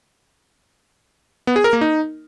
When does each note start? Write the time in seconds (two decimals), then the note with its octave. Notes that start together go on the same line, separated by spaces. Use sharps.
1.47 B3
1.56 G#4
1.64 A#4
1.73 A#3
1.81 D#4